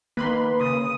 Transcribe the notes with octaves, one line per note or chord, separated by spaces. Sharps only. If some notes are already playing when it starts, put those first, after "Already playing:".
D#3 A#3 B4 B5 C6
C#3 D#6